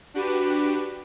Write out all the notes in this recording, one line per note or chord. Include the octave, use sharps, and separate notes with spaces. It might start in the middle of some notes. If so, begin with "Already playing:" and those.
D4 F#4 G4 B4